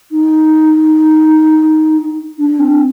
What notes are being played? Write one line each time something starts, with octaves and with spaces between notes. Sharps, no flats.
D#4
D4
C4